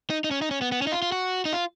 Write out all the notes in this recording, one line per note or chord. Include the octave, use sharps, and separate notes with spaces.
D#4
D#4
C#4
D#4
C#4
B3
B3
C#4
D#4
F4
F4
F#4
D#4
F4